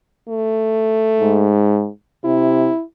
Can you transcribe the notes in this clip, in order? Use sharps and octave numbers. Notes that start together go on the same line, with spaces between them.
A3
G#2
C3 E4